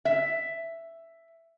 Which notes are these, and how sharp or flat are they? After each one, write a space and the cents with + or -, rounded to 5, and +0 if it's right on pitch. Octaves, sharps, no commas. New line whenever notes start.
E5 +5